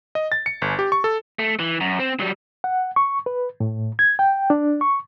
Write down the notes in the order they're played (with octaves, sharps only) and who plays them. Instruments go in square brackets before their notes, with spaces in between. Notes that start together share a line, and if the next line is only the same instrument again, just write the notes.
[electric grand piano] D#5
A6
C#7
G1
G4
C#6
A4
[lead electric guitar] A3
E3
F#2
C4
F#3 G3
[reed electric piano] F#5
C#6
B4
A2
G#6
G5
D4
C#6